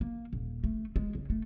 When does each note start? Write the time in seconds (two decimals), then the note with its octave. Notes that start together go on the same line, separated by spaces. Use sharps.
0.01 A#3
0.33 D#1
0.64 A3
0.96 G#3
1.15 C#3
1.30 A3